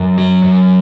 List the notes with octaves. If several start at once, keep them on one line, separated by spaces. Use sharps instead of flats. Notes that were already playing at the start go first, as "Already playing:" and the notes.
Already playing: F#2
F#3
F#2